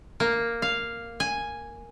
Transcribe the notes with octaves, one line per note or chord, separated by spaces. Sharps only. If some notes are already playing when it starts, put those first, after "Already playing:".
A#3
F5
G#5